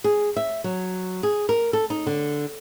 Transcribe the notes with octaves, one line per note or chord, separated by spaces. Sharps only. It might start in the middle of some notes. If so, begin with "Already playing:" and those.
G#4
E5
F#3
G#4
A#4
A4
D#4
D3